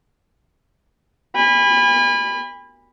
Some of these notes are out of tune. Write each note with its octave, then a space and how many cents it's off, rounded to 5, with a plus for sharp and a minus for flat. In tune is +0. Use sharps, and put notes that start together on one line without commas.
G#5 -40 B5 +0